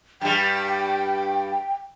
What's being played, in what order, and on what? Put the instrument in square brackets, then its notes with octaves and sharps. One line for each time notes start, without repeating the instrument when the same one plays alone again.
[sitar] G2 G3 [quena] G5